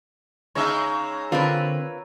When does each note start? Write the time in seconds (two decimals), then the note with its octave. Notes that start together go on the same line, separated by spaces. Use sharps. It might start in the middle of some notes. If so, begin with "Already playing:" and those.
0.55 C#3 G#3 D#4 C#5 E5 A#5
1.32 D3 C4 F4 A#4 B4